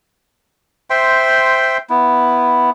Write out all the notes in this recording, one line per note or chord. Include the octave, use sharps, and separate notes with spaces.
C5 E5 G5 C6
B3 E4